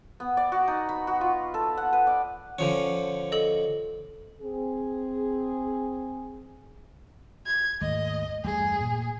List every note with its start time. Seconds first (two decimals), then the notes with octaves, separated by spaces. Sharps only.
0.20 B3
0.37 D5
0.52 F#4
0.68 D#4
0.89 B5
1.07 F#4
1.21 F4
1.54 A4
1.77 F#5
1.93 B4
2.07 D5
2.59 D3 F3 C#4
3.32 A4 D#5
4.42 C4 G#4
7.47 G#6
7.81 D#2 G#2 A3 D#5
8.45 E2 G2 A3 G#4
8.81 A#2